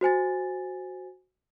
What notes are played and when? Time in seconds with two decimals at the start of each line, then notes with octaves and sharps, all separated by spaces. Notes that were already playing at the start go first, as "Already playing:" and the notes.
0.01 F#4 C5 G#5 A6